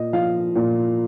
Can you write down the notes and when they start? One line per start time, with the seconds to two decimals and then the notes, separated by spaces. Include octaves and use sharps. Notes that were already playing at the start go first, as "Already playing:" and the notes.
Already playing: A#2 D#5
0.13 F3 F5
0.55 A#2